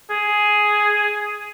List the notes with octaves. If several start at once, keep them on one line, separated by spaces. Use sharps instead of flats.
G#4